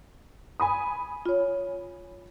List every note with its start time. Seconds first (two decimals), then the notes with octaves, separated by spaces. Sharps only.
0.60 G#5 B5 D#6
1.26 F4 C#5